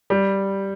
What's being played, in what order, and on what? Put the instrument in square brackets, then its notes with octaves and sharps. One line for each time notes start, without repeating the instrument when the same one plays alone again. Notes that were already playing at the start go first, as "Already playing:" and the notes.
[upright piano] G3